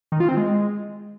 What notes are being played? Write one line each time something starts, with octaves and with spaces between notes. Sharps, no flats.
D#3
F4
C4
G#3